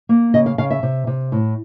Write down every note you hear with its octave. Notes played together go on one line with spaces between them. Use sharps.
A#3
C#3 D#5
F5
C#3 F5
E5
C3
C3
A2